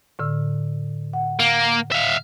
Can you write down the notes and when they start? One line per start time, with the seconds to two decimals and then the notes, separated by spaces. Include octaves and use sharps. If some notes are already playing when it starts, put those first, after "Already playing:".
0.19 A2 D3 E6
1.13 F#5
1.40 A#3
1.92 E5 F5